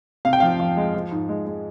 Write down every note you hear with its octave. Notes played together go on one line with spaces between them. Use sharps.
C3 F5
G5
F3 F5
F3
G#3
F3
G#2
G#3
G#3